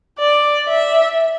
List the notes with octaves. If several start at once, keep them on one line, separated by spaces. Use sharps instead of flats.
D5
E5